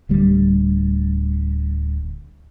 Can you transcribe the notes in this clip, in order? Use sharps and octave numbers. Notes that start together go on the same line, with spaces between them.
D1 D2 G3